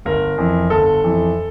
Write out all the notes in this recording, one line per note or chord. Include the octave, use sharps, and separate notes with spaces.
G1 A#4
F2 E3
G1 A4
F2 E3